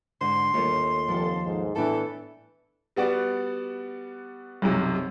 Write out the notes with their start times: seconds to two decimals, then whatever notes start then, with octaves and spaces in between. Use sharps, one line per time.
0.21 G#2 D3 C6
0.54 D#2 A3 F4 C#5
1.08 F1 F3 A4
1.45 G#2
1.76 A2 E3 B3 D4 A4
2.96 G3 B3 F#4 D5
4.62 B1 F#2 C3